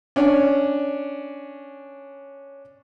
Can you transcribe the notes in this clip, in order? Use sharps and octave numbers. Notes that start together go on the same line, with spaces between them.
C#4 D4